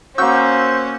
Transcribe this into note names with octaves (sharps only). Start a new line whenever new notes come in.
A#3 C#4 F#4 C5 C#6 E6 G6